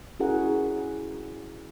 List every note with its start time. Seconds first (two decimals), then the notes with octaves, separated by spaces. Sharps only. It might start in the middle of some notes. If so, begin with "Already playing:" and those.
0.20 C#4 E4 F#4 G#4 A#4 F#5